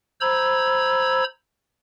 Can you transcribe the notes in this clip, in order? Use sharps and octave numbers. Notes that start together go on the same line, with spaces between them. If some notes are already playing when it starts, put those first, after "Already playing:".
C5 A#5 B5 E6 G#6